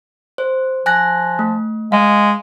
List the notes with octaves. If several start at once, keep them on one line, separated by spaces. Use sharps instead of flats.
C5
F3 G#5 F#6 A#6
A3
G#3 F5